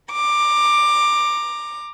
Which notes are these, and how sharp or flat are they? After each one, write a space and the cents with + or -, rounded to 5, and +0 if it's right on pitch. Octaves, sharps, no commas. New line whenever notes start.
A#5 +0 D6 +15